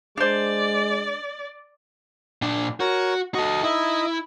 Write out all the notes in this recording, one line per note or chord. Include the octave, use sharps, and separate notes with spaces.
G#3 D4 C5 D5
A#2 D4
F#4 A#4 C#5
F#4 A4 D#5
D#4 E4 D#5